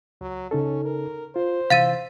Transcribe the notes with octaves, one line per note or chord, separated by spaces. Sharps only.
C#2 F#3
C#3 C#4 D#4 A4
A#4
F4 C5
C3 E3 F5 E6 A6 D#7